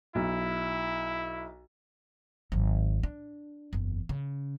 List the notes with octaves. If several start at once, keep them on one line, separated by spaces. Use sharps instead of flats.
B1 E4
G#1 F#3
D4
F#1 E2
C#3